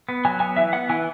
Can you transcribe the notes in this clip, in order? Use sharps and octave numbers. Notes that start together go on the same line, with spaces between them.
B3
F#3 G#5
B3 G#5
E3 E5
B3 F#5
E3 G#5